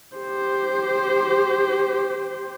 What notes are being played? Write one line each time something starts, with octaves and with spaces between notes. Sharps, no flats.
G4 C5